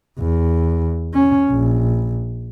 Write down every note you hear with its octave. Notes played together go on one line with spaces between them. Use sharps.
E2
C#4
A#1